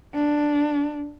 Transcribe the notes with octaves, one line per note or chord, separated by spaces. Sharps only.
D4